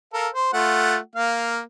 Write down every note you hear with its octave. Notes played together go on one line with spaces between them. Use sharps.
A4 A#4 F5
C5
A3 F4 F#5
A#3 F5